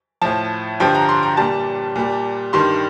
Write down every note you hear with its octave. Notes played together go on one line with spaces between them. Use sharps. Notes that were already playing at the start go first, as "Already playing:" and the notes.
A2 F3 A5
G2 D3 F3 G5
A#5
C6
A#5
A#2 G3 A5
A#2 G3
G2 D#3 G3 C6